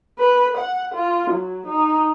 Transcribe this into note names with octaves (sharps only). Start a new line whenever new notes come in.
B4
F#5
F4
F#3
D#4